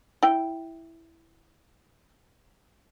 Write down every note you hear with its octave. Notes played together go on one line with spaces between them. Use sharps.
E4 G5